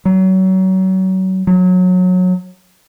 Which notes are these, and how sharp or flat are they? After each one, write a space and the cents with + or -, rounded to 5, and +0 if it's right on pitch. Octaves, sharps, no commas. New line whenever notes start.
F#3 +30
F#3 -20